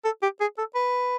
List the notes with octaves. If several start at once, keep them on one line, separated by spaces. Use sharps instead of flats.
A4
G4
G#4
A4
B4